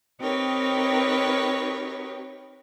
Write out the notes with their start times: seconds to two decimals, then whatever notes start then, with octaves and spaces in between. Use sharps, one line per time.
0.20 C4 D#4 G4 A#4 B4 C#5